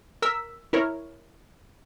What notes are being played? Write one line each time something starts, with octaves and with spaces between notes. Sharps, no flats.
A#4 E6 B6
E4 A#4 C#5